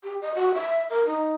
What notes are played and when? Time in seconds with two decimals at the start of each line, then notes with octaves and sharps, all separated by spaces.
0.03 G4
0.21 D#5
0.35 F#4
0.54 E5
0.90 A#4
1.06 D#4